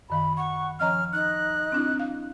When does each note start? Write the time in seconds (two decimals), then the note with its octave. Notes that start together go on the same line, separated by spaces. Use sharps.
0.10 F#2 D#3 F5 B5
0.37 F#5 C#6
0.80 F3 C#4 D#5 A#5 F6
1.13 D#4 F#6
1.72 C4 D4 E4
2.00 F5